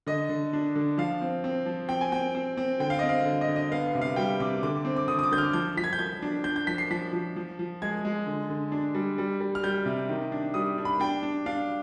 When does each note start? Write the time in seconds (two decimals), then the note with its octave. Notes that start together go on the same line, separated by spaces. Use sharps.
0.07 D3 D#5
0.29 D3
0.53 D4
0.75 D3
0.98 F3 F5
1.21 C4
1.44 C4
1.66 F3
1.89 C4 G5
2.01 G#5
2.12 C4 G5
2.35 C4
2.57 C4
2.80 D3 G5
2.90 F5
2.99 C4 D#5
3.09 F5
3.25 D3
3.41 D#5
3.48 D3
3.56 D#5
3.71 B3 F5
3.87 F5
3.95 C3
4.01 F5
4.16 G3 G5
4.40 C3 D6
4.63 D3 D6
4.85 C4
4.96 D6
5.08 D3 D#6
5.19 D#6
5.23 D6
5.31 D3 G6
5.38 F6
5.53 F3 G6
5.77 F3 B6
5.84 G#6
5.93 G6
5.99 F3 G#6
6.22 D4
6.44 D4 G6
6.56 G6
6.67 F3 B6
6.78 C7
6.90 F3 B6
7.13 F3
7.36 F3
7.59 F3
7.82 G#3 G#6
8.05 G#3
8.26 D3
8.49 D3
8.72 D4
8.95 G3
9.18 G3
9.40 G3
9.55 F6
9.63 G3 G6
9.86 C3
10.09 D#3
10.32 D4
10.54 G3 D#6
10.78 D4
10.85 B5
11.00 D4 G5
11.23 D4
11.46 D4 F5